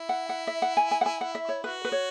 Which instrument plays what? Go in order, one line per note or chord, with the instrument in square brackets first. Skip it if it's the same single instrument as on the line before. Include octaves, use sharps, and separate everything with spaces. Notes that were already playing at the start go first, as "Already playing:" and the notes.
Already playing: [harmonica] E4
[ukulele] F#5
F#5
E5
F#5
G#5
G#5
F#5
G#5
F#5
E5
C#5
[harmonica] F#4 [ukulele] B4
[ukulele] B4
C#5